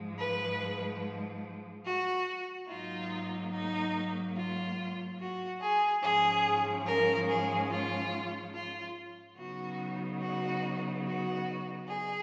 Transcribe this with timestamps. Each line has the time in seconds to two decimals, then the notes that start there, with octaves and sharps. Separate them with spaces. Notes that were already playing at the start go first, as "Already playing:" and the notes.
Already playing: G#2 F3 G#3
0.17 B4
1.85 F#4
2.68 G#2 F#3 A#3 D#4 F4
3.52 D#4
4.35 F4
5.19 F#4
5.60 G#4
6.02 G#2 F3 G#3 C#4 G#4
6.86 A#4
7.28 G#4
7.70 F4
8.53 F4
9.37 C#3 F#3 B3 D#4 F#4
10.20 F#4
11.04 F#4
11.87 G#4